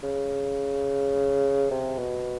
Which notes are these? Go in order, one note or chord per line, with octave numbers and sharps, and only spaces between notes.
C#3
C3
B2